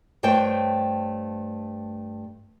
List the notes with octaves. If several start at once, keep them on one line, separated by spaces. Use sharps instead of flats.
G2 A3 C5 C#5 G5